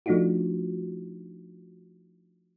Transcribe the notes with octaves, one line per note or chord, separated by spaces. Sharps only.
F3 A3 D4 D#4 F4 F#4